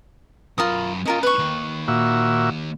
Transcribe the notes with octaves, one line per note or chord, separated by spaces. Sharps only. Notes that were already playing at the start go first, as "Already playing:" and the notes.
F#2 F4 A#4 B5 D#6
C#4 D#4 F4 A#4 D#5
B4 C#6
D#3 A#3
A#2 F#4 E5